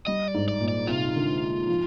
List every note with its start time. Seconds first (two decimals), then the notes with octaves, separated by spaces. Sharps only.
0.07 G3 D#5
0.28 D5
0.34 G#2
0.48 D5
0.61 A#2
0.68 D5
0.87 C3 F4
1.15 D3
1.68 F3